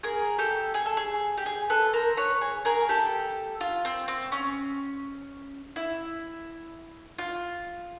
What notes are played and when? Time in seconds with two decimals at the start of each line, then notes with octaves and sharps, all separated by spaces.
0.03 G#4 A#4
0.38 G4 A4
0.74 G#4
0.86 A4
0.97 G#4
1.37 G4
1.46 G#4
1.70 A4 B4
1.93 A#4 C5
2.17 B4 C#5
2.41 G#4
2.65 G#4 A#4
2.89 G4 A4
3.61 F4
3.85 C4
4.08 C4
4.32 C#4
5.76 E4
7.19 F4